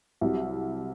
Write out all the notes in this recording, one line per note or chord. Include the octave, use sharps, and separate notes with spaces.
C2 C3 F#3